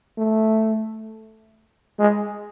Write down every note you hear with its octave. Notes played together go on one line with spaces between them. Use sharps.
A3
G#3